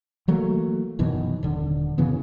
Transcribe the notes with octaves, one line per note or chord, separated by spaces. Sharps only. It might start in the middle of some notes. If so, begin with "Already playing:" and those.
E3 F#3 A3 A#3
F#2 B2 D#3 E3
D#1 D3
F#2 C#3 E3 B3